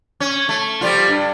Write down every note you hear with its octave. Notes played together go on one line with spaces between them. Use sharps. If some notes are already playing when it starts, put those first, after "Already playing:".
C#4
A3
F3 G3 F4
G2